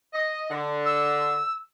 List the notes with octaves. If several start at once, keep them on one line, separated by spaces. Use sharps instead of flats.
D#5
D3
E6